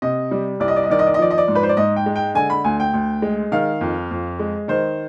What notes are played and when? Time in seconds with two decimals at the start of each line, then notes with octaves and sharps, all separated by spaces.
0.02 C3 D#5
0.31 G3
0.60 C2 D5
0.68 D#5
0.76 D5
0.83 D#5
0.90 D#3 D5
0.99 D#5
1.06 D5
1.14 D#5
1.19 F3 D5
1.31 D#5
1.38 D5
1.48 G#2
1.55 B4
1.63 C5
1.69 D5
1.77 G#2 D#5
1.96 G5
2.06 G#3
2.16 G5
2.35 D3 G#5
2.50 B5
2.64 D2 G#5
2.80 G5
2.94 D2
3.22 G#3
3.52 D#3 F5
3.81 F2
4.11 F2
4.39 G#3
4.68 D#3 C5